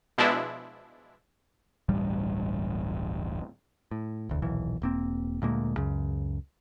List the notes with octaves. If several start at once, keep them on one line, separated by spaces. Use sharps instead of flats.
B2 F3 G#3 D4 E4
D1 A1 G2 G3
A2
E1 D2
D#1 B1 E3
E1 A#3 C4
D2 A#2 G#3 A#3
C#2 F#2 C#3